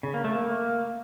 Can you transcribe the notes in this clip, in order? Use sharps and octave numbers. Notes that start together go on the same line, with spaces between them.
C#3
A#3
A3
A#3